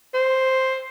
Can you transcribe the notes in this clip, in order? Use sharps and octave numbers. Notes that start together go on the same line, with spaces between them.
C5